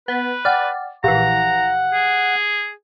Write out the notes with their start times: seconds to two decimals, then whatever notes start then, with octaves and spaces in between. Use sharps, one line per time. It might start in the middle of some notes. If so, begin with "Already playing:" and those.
0.08 B3 B4
0.45 D5 F#5 G5 F6
1.04 A#1 E3 G4 F5 F#5 A#5
1.93 G#4